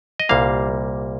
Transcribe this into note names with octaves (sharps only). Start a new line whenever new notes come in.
D#5
C2 A#2 G3 A#3 F5